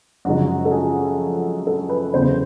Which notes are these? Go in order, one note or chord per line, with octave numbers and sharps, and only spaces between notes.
F#2 C#3 F3 G#3 F#4
A4
G#4
A4
B4
E2 C#3 F#3 C5